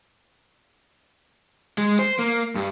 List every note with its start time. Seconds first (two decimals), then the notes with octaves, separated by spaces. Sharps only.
1.78 G#3
1.99 C5
2.19 A#3
2.55 G2